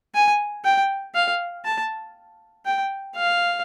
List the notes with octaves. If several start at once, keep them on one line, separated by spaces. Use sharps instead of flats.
G#5
G5
F5
A5
G5
F5